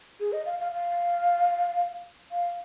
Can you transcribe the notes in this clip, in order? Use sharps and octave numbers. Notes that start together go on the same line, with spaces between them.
G#4
D#5
F5
F5
F5
F5